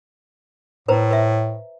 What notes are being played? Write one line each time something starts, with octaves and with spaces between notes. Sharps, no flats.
A2 B4 C5 A#5
B4 E5